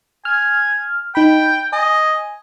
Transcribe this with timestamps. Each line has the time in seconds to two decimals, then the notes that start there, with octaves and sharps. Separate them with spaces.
0.25 G#5 F6
1.15 D#4 G5 B5
1.73 D#5 G#5